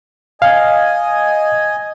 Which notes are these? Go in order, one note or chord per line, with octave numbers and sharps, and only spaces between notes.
D#5 F5 G#5